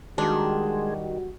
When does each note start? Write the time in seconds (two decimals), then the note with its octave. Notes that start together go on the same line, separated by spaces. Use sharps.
0.18 D#3 G3 G#3 D4 F#4